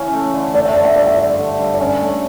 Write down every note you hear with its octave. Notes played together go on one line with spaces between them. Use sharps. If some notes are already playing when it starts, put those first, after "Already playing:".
Already playing: C#3 E3 C#4
A3
D3
A3 D5
E5
D3 D5
E5
G2 D5
E5
F3 D5
D3
G2
D5
C#4 C#5
A3